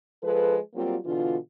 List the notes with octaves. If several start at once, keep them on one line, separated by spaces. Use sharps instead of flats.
F3 G#3 A4 B4
F#3 G3 A#3 C4 F4
B2 D3 E3 D4 F4